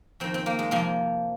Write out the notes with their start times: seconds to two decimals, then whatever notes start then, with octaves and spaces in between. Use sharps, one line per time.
0.20 F2 D#3 C4
0.34 C4
0.46 A#3
0.59 G#3
0.71 F2 C3 F3 A#3